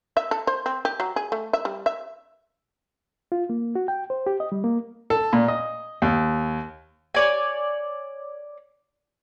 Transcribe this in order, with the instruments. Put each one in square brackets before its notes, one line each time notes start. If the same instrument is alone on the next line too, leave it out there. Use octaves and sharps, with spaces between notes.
[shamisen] E5
A4
C5
C4
G4
F#3
G#4
A3
E5
G3
E5
[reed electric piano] F4
A#3
F#4
G5
C5
G4
D#5
G3
A#3
[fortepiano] A4
A#2
D#5
D#2
[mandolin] C#5 D5 G#5